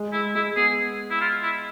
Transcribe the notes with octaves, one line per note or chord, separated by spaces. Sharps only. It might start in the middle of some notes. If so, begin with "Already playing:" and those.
Already playing: G#3
E4
G#3 E4
B3 G#4
E4
F4
E4